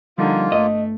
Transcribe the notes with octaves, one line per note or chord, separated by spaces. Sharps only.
D3 F3 G3 A#3 D#4 F4
G1 A3 D#5